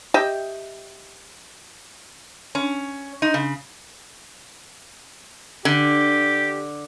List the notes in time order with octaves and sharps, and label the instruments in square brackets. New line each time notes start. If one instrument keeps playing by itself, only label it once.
[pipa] G4 D#5 E5 G5
[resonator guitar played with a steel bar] C#4
D#4
C#3
[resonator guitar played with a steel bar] D3 [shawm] G4